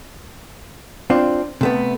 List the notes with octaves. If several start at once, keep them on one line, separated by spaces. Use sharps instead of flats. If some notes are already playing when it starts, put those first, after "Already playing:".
C4 D4 F4
C3 A3 B3